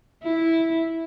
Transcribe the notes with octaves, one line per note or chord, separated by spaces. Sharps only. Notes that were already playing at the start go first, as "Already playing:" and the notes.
E4